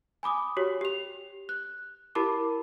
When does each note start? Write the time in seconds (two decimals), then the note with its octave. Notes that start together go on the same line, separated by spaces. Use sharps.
0.23 G#5 B5 D6 D#6
0.57 F#4 G4 C#5
0.81 G4 F7
1.49 F#6
2.15 E4 G4 A#4 A5 B5 D6